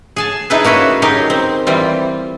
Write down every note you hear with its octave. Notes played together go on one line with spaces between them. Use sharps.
G#4 G#5 A5
D#4 E4 G#4 A4 B4
A#3 C#4 F#4 B4 E5
F#3 D#4 G4 G#4 A#4
C4
E3 G3 C4 F4